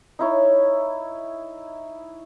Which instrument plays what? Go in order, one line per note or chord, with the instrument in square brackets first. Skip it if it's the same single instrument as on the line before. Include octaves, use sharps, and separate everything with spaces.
[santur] D#4 E4 C#5